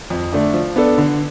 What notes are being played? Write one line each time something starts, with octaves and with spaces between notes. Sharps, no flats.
F2
D3 A3 D4
F3
B3 D4 A4
D3